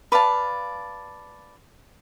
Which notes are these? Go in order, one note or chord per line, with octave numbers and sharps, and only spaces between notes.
B4 D5 F5 A5